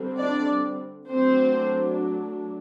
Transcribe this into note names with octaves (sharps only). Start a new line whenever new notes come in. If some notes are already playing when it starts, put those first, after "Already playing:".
Already playing: D3 G3 C4
D4 D5
F#3 A3 C4 D4 C5